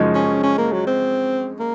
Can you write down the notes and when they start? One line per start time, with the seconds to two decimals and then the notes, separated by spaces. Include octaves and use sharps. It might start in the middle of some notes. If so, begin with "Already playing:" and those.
Already playing: F#2 C#3 F3 G#3 D#4
0.15 C#4
0.43 C#4
0.58 A#3
0.73 F#3
0.87 C4
1.60 A#3